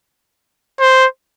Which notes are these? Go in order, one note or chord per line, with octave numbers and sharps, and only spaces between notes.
C5